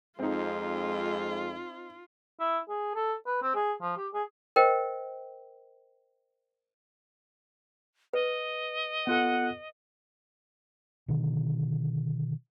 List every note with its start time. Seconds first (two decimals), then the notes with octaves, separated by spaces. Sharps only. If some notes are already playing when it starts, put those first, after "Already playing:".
0.19 F2 G#3 C4 D#4 F4
2.40 E4
2.69 G#4
2.95 A4
3.26 B4
3.42 C4
3.55 G#4
3.81 F3
3.97 G4
4.14 G#4
4.56 A#4 C5 D#5 G5
8.13 B4 D#5
9.07 B3 F4 A4 F#5
11.08 B2 D3 D#3